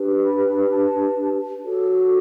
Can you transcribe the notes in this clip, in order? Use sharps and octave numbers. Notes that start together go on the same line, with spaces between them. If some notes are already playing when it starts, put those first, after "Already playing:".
Already playing: D4 G4 B4
B5
A5
F#4 A4 C#5